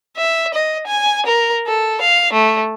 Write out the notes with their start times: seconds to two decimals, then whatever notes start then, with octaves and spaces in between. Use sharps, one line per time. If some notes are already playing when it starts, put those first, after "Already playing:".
0.17 E5
0.54 D#5
0.87 G#5
1.26 A#4
1.67 A4
2.01 F5
2.33 A3